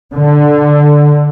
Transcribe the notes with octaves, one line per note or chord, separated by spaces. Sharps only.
D3